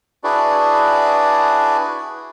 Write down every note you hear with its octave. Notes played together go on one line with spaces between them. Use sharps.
D4 E4 F#4 G#4 B4 D5